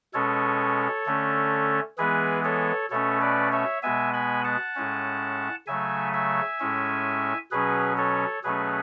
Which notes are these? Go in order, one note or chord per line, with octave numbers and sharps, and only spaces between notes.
B2 G#3 C#4 A4 C#5
D3 A3 C#4
E3 G#3 B3 G#4 B4
A4 C#5
B2 A3 C#4 A4 C#5
B4 D5
C#5 E5
B2 G#3 B3 E5 G#5
G#5 B5
F#5 A5
A2 G#3 C#4
C#3 F#3 A3 E5 G#5
E5 G#5
A2 G#3 C#4
B2 F#3 C#4 G#4 B4
A4 C#5
B2 F#3 A3 C#4 G#4 B4